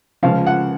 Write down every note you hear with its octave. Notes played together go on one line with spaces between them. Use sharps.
C#2 C#3 F3 F5
F#5